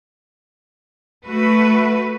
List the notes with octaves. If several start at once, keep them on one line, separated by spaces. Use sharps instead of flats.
A3 F#4 B4